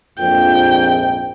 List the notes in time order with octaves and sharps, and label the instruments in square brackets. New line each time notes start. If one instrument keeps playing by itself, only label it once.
[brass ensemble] A#1 F2 G#2 [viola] G5